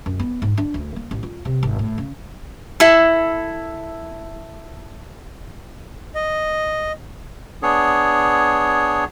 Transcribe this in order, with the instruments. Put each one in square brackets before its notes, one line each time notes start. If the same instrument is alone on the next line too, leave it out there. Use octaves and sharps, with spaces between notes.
[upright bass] F#2
B3
G#2
D4
D2
A#3
A1
F4
C3
G#1
A2
C#3
[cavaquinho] E4 A4
[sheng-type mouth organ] D#5
[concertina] B3 D4 G#4 C#5